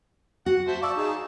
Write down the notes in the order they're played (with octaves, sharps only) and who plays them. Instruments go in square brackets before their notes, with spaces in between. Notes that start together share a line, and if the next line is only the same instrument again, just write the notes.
[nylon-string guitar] F#4 [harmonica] F#5
[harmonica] C5 E5 A5
[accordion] D5 D6 [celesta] F5 C#6 E6 [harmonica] A5
[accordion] D#4 G#4